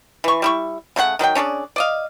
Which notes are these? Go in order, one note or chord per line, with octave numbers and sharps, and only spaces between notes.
E3 C#6
G3 E4 C#6
C#3 A3 D4 F#5
D#3 F#3 E4 G5
C#4 D4 G#4 D5
D5 D#5 F5